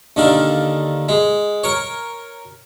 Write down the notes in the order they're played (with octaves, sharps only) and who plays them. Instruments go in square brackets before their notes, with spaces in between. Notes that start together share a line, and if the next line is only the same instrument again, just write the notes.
[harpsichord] D#2 D3 D#3 F5
G#3
A#4 C#5